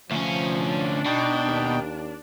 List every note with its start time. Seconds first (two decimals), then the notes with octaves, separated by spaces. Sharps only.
0.11 D2 F3 C#4
0.58 D4
1.06 B2 D#4 G5
1.47 D#2